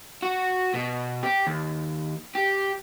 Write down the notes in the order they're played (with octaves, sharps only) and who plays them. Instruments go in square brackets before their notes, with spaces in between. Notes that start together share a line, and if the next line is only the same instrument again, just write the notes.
[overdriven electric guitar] F#4
B2
G4
D#2
G4